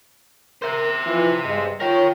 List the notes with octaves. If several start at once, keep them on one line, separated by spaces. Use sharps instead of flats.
A#4 C5 E5
F2 E3 F4
G2 G#3
F4 A#4 C#5 G5